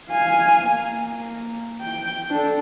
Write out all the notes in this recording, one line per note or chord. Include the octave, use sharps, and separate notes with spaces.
F5 G#5
A#3
G5
D4 A4